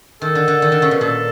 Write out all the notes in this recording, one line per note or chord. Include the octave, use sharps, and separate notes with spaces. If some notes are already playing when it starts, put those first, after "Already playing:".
D#3 A4
D3
D3
D#3
D3
C#3
B2
A#2 A4